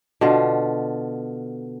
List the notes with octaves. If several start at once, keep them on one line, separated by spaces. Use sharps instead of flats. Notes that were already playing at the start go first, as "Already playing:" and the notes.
B2 D3 F4